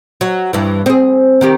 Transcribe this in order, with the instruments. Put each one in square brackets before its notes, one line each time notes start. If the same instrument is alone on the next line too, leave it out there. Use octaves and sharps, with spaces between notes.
[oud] F#3
G2 E3
C4 G#4
D#3 C4 G4